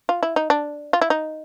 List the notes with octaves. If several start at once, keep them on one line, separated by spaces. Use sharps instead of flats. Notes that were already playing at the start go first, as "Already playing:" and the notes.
F4
E4
D#4
D4
F4
E4
D#4